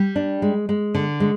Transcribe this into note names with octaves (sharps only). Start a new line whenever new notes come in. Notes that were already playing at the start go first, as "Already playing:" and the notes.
Already playing: G3
D4
G#3
G#3
D3
G#3